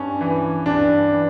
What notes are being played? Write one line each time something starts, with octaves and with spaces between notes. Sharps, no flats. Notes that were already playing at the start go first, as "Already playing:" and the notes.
Already playing: G2 C#4
E3
G2 D4
E3